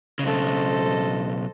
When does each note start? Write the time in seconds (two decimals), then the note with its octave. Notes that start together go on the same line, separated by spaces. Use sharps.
0.19 B1 C#3 A4 C5 D#5